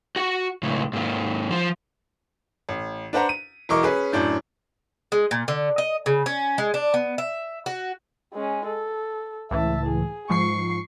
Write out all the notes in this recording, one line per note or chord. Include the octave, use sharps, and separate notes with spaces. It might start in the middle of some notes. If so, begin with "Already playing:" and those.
F#4 F#5
C#2 A2
G#2 A#3
F3 F4
A1
D4 B4 C5 F#5 A#5
D#7
E1 E3 A#4 D#5 C#6 D6
C#4 G#4 B4
F#2 A2 D4 G6
G#3
A#2
D3
D#5
C#3
C#4
G#3
D4
B3
E5
F#4
G#3 C#4
A4
C#2 A2 E3 E5 A5
G#4
G#2 F3 C#6 C7